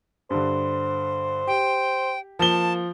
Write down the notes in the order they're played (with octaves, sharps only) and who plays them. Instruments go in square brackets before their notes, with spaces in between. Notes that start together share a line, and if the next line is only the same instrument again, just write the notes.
[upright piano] G2 D3 [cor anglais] C5
[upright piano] G4 [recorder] G5
[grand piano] F3 G7 [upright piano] A#3 [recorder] A5